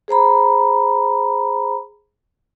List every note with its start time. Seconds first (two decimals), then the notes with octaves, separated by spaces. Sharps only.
0.08 G#4 C5 A#5 B5